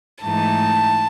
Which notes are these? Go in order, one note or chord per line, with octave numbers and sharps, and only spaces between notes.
G#2 E3 A3 D#4 A5